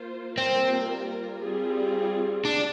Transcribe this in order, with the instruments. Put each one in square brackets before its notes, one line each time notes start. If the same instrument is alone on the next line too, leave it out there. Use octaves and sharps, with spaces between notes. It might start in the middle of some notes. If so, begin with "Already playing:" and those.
Already playing: [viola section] A#3 F4 C5
[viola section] G3 A#3 F4 A#4 [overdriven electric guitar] C4
[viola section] G3 C4 F4 G#4
[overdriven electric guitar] D4